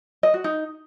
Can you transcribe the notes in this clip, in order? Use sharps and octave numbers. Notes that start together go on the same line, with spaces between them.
D#5
F#4
D#4